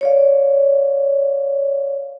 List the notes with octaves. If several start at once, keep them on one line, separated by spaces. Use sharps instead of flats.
C#5 D5 F5